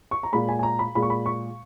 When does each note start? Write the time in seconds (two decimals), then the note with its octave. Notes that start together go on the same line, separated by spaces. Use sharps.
0.11 C#6
0.23 A#5
0.32 A#2 G#3 B5
0.49 G#5
0.59 G#5
0.63 A#5
0.79 B5
0.95 A#2 G#3 B5
1.02 C#6
1.10 B5
1.26 C#6